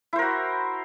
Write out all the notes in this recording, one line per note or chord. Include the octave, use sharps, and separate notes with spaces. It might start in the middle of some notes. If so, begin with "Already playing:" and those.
E4 F#4 A#4 C5